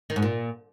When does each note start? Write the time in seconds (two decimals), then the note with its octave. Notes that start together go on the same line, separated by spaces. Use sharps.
0.10 D#3
0.16 G#2
0.22 A#2